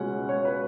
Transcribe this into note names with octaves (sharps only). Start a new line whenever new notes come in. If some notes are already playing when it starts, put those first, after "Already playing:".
Already playing: C#2 B2 G#3 C#4 F#5
C#5
B4